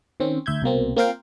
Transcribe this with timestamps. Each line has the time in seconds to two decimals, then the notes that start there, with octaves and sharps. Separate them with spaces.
0.20 D#3 C4 C#4
0.46 D2 E5 G6 G#6
0.62 C2 B2 A#3 C4
0.97 A#3 C4 F4 A#4 F5 G5